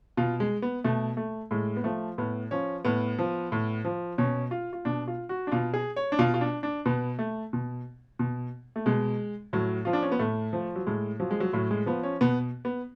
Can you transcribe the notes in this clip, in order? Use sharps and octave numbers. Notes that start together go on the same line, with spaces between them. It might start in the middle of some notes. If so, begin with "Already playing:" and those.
B2 F4
G#3
B3
B2 A3
A3
A2 G#3
B3
F3 A3
A2 B3
F3 C#4
A2 B3
F3
A2
F3
B2 C#4
F4
F4
B2 D4
F4
F#4
D4
B2 F4
G#4
C#5
D4
B2 F4
F4
D4
D4
B2 B3
A3
B2
B2
A3
B2 G#3
A2 F#3
F3 F4
D4
C#4
B3
A2 A3
F3
F#3
A2 G#3
F3 F#3
G#3
F#3
A2 F#3
G#3
F3 B3
C#4
B2 B3
B3